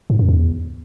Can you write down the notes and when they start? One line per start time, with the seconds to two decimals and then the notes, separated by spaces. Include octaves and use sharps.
0.10 G#2
0.19 F#2
0.29 E2